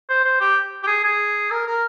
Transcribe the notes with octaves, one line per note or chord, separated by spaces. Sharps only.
C5
C5
G4
G4
G#4
G#4
A#4
A#4